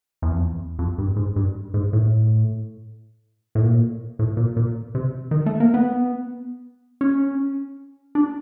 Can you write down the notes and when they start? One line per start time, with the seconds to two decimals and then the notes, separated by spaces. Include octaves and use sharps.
0.22 E2
0.32 F2
0.42 E2
0.79 F2
0.98 G2
1.16 G#2
1.36 G2
1.74 G#2
1.93 A2
3.55 A2
3.62 A#2
4.19 A2
4.37 A#2
4.57 A#2
4.95 C3
5.31 D#3
5.46 A3
5.60 A#3
5.74 B3
7.01 C#4
8.15 D4